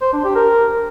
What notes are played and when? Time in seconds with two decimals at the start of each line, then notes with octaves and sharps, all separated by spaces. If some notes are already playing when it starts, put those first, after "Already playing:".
0.02 C5
0.13 D4
0.24 G4
0.35 A#4